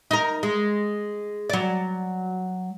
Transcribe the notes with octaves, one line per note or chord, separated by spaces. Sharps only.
D#4 A#4
G#3
F#3 D5